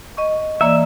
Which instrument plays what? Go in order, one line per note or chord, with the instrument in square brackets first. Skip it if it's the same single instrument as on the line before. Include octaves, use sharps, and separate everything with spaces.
[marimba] D#5 C#6
[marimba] E3 A#3 D5 [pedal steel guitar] E5